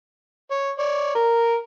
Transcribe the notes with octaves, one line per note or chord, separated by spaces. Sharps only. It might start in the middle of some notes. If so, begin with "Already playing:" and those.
C#5
C#5 D5
A#4